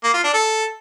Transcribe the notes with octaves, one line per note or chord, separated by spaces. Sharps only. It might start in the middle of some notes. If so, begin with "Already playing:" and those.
A#3
F4
D4
A4